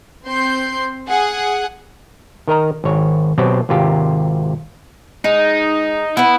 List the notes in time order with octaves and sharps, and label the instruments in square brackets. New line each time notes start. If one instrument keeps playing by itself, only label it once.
[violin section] C4 C6 G6
G#4 F#5
[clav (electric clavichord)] D#3 A#4 D#5 A#5
G#1 C#5
B2 F#3 C4 G4
G#1 C3 F4 G4
[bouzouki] G#3 [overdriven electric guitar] D#4
[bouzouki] B3 B4 [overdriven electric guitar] E4